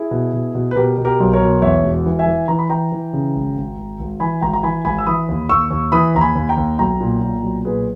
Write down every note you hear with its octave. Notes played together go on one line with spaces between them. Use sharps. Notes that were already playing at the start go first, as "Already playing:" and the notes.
Already playing: E4 G#4
B2
B2
B2
B4
B2 G4 A#4
B2
G4 A#4
B1
A#4 C#5
B2
E2 C#5 E5
E1
E3
E5 G#5
E3
E3 A#5
B5
E3 G5 A#5
E3
C#3
G#1
G#1
G#1
G#1
E3 G#5 B5
G#1 G5 A#5
A#5
E3 G#5 B5
G#1 G#5 B5
E6
E3 B5 D#6
D#2
D#2 C#6 E6
D#2
E3 B5 D#6
D#2 A#5
G#5 B5
D#2
G5 A#5
D#2
B1 G5 A#5
A#2
A#2
B1
A#2 G#4 B4